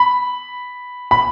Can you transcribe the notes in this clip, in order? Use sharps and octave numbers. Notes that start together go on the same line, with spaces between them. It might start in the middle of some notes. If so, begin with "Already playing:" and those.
Already playing: B5
B5